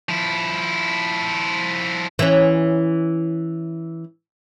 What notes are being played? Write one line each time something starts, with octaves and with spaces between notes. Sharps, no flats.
F3 E4
E3 C#4